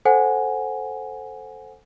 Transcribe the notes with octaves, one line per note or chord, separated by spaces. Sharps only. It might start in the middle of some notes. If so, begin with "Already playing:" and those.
A4 C5 F#5 G#5